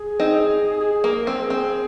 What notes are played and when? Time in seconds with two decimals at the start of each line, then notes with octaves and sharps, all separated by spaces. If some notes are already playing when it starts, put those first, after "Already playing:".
Already playing: G#4
0.20 C4 D#4
0.80 G#4
1.04 A#3
1.12 A#4
1.27 C4
1.42 G#4
1.50 C4